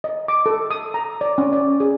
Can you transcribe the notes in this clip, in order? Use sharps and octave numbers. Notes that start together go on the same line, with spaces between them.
D#5
D6
A4
D#6
A#5
D5
C#4
D5
G#4